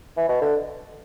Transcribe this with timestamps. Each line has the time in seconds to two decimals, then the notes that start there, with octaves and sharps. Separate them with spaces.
0.17 E3
0.28 B2
0.41 D3